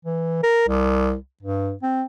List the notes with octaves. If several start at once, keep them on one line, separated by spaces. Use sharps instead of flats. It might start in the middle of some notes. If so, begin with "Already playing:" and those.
E3
A#4
C2
G2
C4